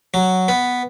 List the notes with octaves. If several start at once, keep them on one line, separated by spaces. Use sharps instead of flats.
F#3
B3